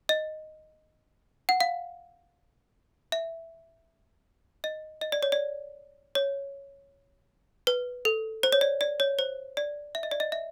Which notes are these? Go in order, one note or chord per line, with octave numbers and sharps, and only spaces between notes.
D#5
F#5
F5
E5
D#5
D#5
D5
C#5
D5
C#5
B4
A4
C5
C#5
D5
D5
C#5
C5
D5
E5
D#5
D5
D#5
E5